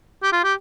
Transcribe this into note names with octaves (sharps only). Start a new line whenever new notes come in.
G4
F4
G4